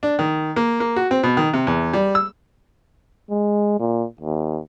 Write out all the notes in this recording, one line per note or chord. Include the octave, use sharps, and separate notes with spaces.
D4
D#3
A#3
A#3
F#4
C4
B2
D#3
C3
E2
G3
E6
G#3
A#2
D#2